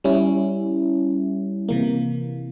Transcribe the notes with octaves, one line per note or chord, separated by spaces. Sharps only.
G3 C#4 E4
C3 E3 A#3